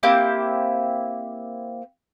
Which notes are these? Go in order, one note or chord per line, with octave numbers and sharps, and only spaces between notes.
A#3 C4 E4 G4